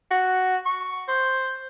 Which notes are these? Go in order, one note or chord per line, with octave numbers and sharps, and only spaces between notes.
F#4
C#6
C5